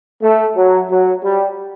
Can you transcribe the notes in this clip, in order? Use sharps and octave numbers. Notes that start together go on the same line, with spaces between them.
A3
F#3
F#3
G3